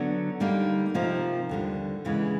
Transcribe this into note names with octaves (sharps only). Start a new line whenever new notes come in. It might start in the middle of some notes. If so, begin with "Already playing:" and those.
Already playing: D3 F#3 B3 D4
D3 G3 A#3 D#4
C3 F3 A#3 D#4
D#2 D3 G3
E2 C#3 E3 G#3